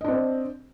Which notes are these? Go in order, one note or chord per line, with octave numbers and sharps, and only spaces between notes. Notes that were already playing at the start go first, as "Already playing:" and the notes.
C4 D4 D#5